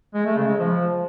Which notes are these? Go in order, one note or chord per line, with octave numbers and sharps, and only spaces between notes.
G#3
A3
C#3
G#3
F3